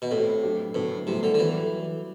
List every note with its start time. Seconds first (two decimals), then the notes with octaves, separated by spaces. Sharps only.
0.02 B2
0.11 A2 A3 C4 G4
0.43 F#3 A3 D4 G4
0.75 A2 D3 F#3 B3 D4
1.06 A2 C3 G3 B3 E4 A4
1.23 D3
1.34 D3
1.39 E3 F#3 B3 E4 G4